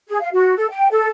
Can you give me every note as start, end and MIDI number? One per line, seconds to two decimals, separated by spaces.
0.08 0.19 68
0.20 0.28 77
0.32 0.53 66
0.56 0.66 69
0.70 0.88 79
0.91 1.08 69